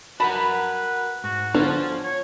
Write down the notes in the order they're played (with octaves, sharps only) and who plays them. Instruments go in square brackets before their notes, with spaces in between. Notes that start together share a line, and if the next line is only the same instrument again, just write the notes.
[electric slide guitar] F#4 A#4 F#5 [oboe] B4 [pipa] A5 B5
[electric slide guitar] G#2 [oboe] F#4
[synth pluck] D3 B3 D4 [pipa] F#3 [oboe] C#4 [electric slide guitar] F4 C5 A5
[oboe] C#5